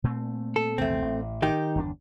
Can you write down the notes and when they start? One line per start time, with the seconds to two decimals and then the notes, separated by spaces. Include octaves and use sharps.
0.04 A#2 A3 C4
0.56 A4
0.78 A#1 E2 C3 A3 C4
1.02 A1
1.42 D#3 D#4 G4
1.76 G1 E2 D4